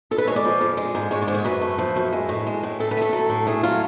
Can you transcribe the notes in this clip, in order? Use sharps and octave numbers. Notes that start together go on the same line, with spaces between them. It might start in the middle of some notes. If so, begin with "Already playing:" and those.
F2 A4
B4
G#3 C#5
D5
F3
F2
G#3
G#2
G#3 C#5
D5
G#2
C#5
F#2 B4
A3
F3
F#2
G#3
A2
G#3
A2
A2 A4
B4
A3 A4
F#3
A2
A3 G#4
F#3 F4